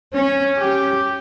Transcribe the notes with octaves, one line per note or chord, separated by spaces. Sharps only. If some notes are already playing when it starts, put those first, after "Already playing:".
C#4
G4